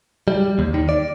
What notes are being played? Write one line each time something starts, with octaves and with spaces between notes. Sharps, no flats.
G3
D#2
D#3
D5